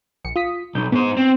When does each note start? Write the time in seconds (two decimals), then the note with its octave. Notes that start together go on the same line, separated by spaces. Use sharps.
0.25 A#1 C#7
0.36 F4 D#6 B6
0.75 B1 G6
0.92 G#2 B3 C5
1.17 C4